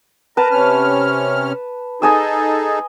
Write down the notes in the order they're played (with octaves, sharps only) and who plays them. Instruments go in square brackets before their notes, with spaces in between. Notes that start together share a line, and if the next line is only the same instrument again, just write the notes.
[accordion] A#4 A#5 [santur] B4 A5
[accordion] C3 C#4 F6
[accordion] D#4 G#4 A4 [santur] D#5 G#5 E6